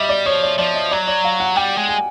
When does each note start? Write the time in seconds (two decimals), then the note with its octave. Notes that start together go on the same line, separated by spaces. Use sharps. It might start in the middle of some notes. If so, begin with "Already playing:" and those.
Already playing: G3 D#5 E5
0.09 D5
0.26 F3 C#5
0.43 D5
0.58 F3 D5
0.75 D#5
0.91 F#3 D5
1.07 D5
1.24 F5
1.40 F#5
1.56 G3 G5
1.77 G#3
1.89 G#5